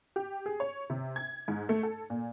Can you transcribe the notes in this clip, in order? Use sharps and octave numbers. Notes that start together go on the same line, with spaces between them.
G4
G#4
C#5
C3
G#6
G#2
A3
A4
A#2